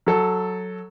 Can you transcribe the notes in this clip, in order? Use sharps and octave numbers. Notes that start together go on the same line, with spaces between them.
F#3 A4